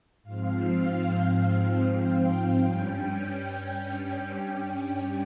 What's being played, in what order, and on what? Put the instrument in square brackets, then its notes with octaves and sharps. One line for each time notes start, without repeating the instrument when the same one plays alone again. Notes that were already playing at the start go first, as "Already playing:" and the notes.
[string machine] G#2 F3 C4 F5
G5
G2 G3 C#4